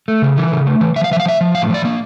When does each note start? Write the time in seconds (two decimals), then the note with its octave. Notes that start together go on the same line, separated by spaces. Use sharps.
0.08 A3
0.22 C#3
0.37 E3
0.52 C#3
0.67 A3
0.81 E3
0.96 F3 E5
1.04 F5
1.11 F3 E5
1.20 F5
1.25 F3 E5
1.41 F3
1.55 A2 F5
1.70 F3 D5
1.85 A#3